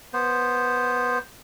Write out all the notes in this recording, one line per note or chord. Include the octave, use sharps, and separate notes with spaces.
B3 C5